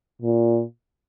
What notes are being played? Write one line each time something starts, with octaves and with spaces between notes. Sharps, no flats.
A#2